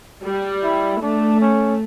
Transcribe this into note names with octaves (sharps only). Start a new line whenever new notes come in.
G3
E4
A3 D4
C#4